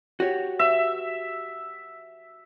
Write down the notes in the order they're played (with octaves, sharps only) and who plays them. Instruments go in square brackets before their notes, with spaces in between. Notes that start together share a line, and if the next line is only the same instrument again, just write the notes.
[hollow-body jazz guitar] F#4 G4 C#5
[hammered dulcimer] E5